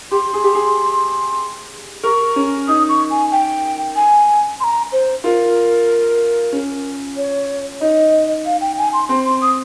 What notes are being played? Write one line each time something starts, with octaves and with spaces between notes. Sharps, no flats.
G4 C6
G#4
G4
G#4
A#4 C#6
C#4
D#4 D#6
C#6
G#5
G5
G#5
C6
A#5
C5
F4 A#4
C#4
C#5
D#4 D#5
F5
G5
G#5
C6
C4 C6
C6
D#6